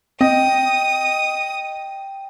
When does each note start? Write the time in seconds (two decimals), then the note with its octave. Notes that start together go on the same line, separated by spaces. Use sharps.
0.21 C4 D#5 G5 D#6